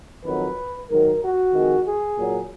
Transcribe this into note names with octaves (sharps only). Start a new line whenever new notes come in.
F2 D#3 F#3 B4
G#2 D#3 F#3 A#4
F#4
F2 D#3 G#3
G#4
A#2 F#3